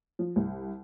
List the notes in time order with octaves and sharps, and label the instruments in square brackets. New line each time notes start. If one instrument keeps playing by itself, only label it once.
[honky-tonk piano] F3
C2